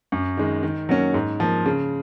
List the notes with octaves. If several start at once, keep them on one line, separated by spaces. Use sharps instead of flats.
F#2
D#3 G#3
D#3
F#3 A#3 C#4
G#2
F3 A#3
C#3